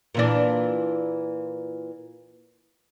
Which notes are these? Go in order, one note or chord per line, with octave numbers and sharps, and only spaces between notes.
A#2 E3 D4